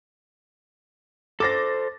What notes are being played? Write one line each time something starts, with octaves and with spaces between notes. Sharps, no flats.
A4 C5 D6 A6 A#6